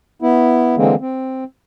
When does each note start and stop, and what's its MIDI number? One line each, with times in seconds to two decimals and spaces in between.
0.22 0.75 59
0.22 0.75 64
0.77 0.95 50
0.77 0.95 52
0.77 0.95 56
0.77 0.95 58
0.77 0.95 60
1.01 1.44 60